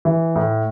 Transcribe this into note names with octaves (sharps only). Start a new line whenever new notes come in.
E3
A2